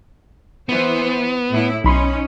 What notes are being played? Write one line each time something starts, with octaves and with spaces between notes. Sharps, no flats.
E3 B3 C5
A2 E4
B1 C#4 D#4 B5 C6